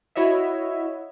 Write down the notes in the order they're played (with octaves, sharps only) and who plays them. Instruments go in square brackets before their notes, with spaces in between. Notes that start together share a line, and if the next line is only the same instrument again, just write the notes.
[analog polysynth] E4 F#4 C#5 D#5 E5